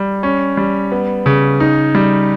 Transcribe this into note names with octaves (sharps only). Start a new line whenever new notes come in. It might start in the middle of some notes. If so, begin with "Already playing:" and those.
Already playing: G3
C#4
G3
B3
C#3
D#4
G3